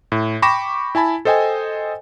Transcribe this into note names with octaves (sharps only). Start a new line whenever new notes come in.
A2
G5 B5 C#6 D6 A#6 E7
E4 G#5 A5 B5
A4 C5 D#5 G5 G#5